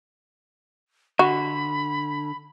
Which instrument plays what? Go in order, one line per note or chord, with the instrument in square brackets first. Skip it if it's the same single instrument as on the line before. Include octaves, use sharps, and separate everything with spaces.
[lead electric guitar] D3 [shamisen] F#4 [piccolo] B5